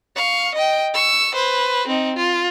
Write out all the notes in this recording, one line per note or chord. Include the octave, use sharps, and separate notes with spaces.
F5 C#6
D#5 G5
C#6 E6
B4 C5
C4 D#4
F4